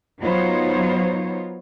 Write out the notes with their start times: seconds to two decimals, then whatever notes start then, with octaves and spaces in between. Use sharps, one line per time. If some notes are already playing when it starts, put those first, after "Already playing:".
0.19 F#3 B3 D#4 F4 C5 C#5